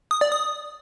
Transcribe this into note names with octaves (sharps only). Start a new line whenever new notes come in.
D#6
D5
D#6